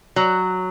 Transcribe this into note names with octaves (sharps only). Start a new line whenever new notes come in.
F#3